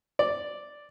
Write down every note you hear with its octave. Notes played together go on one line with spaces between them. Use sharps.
D5